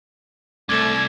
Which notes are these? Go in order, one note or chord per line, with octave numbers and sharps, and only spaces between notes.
C2 A3 D6 G#6 A6 E7